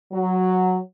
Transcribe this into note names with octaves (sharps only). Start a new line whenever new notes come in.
F#3